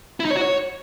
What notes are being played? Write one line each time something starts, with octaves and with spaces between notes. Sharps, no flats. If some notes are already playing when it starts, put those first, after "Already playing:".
E4
D#4
C#5
F#4
C#5